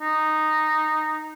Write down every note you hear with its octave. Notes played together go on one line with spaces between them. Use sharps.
D#4